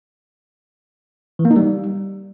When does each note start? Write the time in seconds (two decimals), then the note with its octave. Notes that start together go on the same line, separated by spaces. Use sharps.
1.39 E3
1.45 A#3
1.51 D#4
1.56 G3